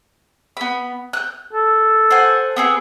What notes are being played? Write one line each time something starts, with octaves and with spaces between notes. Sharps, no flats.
B3 B5
F#6 G6
A4
C5 F#5 G#5
B3 C4 G#4